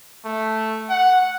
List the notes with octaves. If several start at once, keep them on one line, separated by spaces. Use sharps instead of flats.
A3
F#5